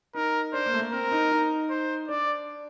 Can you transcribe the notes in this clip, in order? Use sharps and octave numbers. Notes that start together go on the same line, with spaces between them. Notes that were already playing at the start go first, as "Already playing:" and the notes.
D#4 A#4
D4 C5
A#3
A3
A#3
C4 A#4
D#4
D#4
C5
D4 D5